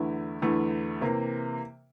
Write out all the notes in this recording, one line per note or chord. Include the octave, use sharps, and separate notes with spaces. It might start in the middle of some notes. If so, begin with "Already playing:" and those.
Already playing: E2 D3 A3 E4
E2 D3 A3 E4
C3 E3 A#3